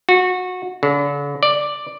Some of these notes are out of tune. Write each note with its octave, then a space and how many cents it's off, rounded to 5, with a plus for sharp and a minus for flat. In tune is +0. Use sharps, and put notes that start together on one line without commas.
F#4 -20
D3 -40
D5 +5